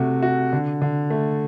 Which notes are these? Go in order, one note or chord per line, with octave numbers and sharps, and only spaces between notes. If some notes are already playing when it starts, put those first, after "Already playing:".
Already playing: C3 A3 F#4
F#4
D3
D3
A3